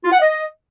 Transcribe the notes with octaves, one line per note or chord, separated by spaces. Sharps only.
F4
F#5
D#5